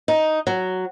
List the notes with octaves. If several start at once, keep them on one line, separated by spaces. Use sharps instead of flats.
D#4
F#3